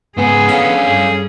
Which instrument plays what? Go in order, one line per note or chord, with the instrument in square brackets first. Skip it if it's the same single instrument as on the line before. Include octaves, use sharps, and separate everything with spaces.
[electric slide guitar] G#2 C#3 G#5 [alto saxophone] B3 [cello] G#4
[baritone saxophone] C#4 [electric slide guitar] A4 C#5 F5
[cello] G2 [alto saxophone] G#4